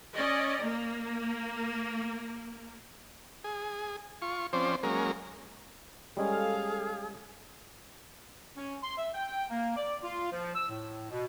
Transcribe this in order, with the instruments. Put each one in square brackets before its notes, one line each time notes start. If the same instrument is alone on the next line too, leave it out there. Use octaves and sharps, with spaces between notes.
[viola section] C#4 D5 D#5
A#3
[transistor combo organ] G#4
F4 C#6
F3 C4 C#4 C5 D5
F#3 G#3 A#3 C#4 A#4
[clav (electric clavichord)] G3 G#3 C#4 [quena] G#4 [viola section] A4 F5
[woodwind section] C#4
C6
E5
G5
A#3
D5
F4
F3
E6
A2
B2